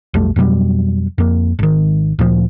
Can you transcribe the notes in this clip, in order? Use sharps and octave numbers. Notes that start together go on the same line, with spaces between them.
B1 F2 G3 A3
F2 B2 F#3 G3
F2 A#3
G#1 D#3
D2 A#2 F3